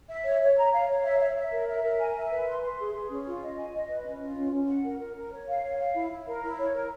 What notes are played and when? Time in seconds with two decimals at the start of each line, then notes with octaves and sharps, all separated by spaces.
0.09 E5
0.25 C#5
0.41 C#5
0.56 A#5
0.72 F5
0.89 C#5
1.04 E5
1.20 E5
1.36 E5
1.51 A#4
1.67 E5
1.83 A#4
1.99 G#5
2.15 E5
2.30 B4
2.47 C6
2.63 C6
2.79 G#4
2.94 G#4
3.09 C#4
3.26 F4
3.42 D#5
3.57 G#5
3.74 D#5
3.89 B4
4.05 C#4
4.21 F4
4.37 C#4
4.52 C#4
4.68 F#5
4.84 A#4
5.00 A#4
5.16 A#4
5.32 C#5
5.48 F5
5.63 C#5
5.79 F5
5.95 E4
6.11 E4
6.27 A#4
6.43 E4
6.58 C#5
6.75 A#4